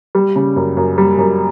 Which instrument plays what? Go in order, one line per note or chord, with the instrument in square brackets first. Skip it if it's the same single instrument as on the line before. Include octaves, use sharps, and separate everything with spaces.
[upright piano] G3
C#3
F#2
F#2
G3
F#2